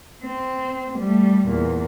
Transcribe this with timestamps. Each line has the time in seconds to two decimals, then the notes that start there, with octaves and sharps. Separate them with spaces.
0.24 C4
0.99 G3 A3
1.47 E2 A#2